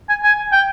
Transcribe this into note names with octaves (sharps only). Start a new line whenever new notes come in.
G#5
G#5
G5